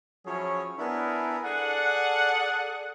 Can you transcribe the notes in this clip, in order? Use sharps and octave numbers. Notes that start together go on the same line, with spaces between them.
F3 F#3 C#4 E4 G#4 C#5
B3 D4 E4 G#4 A#4
G#4 A4 D5 F#5